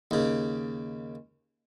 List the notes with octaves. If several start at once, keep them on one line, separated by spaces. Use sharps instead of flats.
D#2 C#3